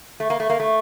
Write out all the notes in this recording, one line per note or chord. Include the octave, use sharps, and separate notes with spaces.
A3
A#3
A3
A#3
A3